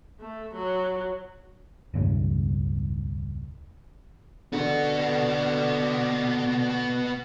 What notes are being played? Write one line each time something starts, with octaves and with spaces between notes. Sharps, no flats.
A3
F#3
E1 C#2 G2
D3 B3 D4 F#4 A4 F#5